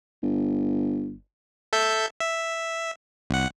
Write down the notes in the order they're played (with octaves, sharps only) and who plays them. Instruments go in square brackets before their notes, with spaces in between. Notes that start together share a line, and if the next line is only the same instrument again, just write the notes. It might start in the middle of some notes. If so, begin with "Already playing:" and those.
[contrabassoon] G1
[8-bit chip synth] A4 E5 G6
E5
C2 F#5